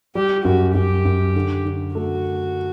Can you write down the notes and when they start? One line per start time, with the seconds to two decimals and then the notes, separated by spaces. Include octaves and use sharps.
0.15 G3 G4
0.45 F#2 F#4
0.75 F#2 G4
1.05 F#2
1.36 D3
1.65 D3
1.95 A3 F#4